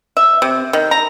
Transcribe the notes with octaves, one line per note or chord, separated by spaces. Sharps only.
E5
C3
D#3
A#5